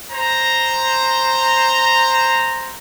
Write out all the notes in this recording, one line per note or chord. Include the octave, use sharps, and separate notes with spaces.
C5 A#5